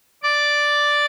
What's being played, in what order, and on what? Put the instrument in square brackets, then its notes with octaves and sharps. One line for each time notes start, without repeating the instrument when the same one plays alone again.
[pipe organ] D5 D6